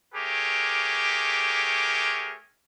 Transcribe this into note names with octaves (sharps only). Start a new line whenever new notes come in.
A3 G4 G#4 A#4 C#5 D6